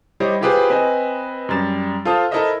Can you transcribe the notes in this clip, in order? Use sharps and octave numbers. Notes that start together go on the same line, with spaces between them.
G3 E4 G4 C5 C#5 D#5
E4 F4 G4 G#4 B4 C5
C4 B4 D#5 G#5
F#2 G3 A6 E7
F4 A4 C5 F5 A5 D#6
E4 A4 A#4 C5 D#5 E5